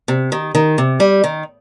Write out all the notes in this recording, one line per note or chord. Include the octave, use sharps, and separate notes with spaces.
C3
D#3
D#3
C3
G3
D#3